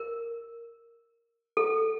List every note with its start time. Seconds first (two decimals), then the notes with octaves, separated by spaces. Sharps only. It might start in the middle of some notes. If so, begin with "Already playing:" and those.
Already playing: A#4
1.57 A4